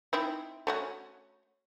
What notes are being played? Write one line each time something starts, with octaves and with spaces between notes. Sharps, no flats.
C4 D#4 E4
A3 C#4 F#4